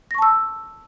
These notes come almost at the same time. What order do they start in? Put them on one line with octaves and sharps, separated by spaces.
A#6 C#6 A5 E6